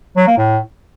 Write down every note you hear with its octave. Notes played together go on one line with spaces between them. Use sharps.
F#3
A#3
A2